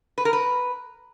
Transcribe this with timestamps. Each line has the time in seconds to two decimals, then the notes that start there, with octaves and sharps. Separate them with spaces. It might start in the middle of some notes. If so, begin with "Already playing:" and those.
0.18 B4
0.25 A#4
0.33 B4